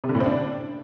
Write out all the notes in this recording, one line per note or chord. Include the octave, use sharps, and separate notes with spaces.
C3
D3
A2
C4
D4